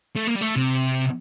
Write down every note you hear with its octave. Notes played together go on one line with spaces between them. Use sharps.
A3
A#3
G3
A3
C3